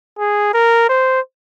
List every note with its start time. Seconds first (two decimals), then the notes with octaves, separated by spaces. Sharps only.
0.19 G#4
0.54 A#4
0.89 C5